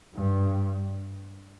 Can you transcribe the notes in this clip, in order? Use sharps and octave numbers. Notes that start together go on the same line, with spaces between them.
G2